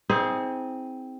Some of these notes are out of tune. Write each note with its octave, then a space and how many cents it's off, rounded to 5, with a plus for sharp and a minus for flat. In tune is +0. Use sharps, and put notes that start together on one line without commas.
C4 -5 D#4 +45 G#4 +0